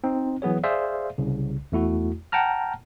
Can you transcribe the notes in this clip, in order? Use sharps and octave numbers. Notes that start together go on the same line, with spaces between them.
C4 D#4
E3 F#3 B3 G#4 C#5
G#4 C5 D5 E5 F5
C2 C#3
E2 A3 E4 F#4
F#5 G5 A5 A#5 F6